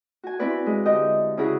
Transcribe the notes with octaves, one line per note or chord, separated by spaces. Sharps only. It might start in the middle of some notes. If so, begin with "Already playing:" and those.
F#4 G#5
C4 E4 F#4 B4 D5
G#3
D3 G4 D#5 G6
C#3 C#4 D4 E4 F#4 G#4